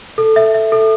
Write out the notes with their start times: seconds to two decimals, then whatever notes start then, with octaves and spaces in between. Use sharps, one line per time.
0.18 A4
0.36 E5
0.54 E5
0.72 A4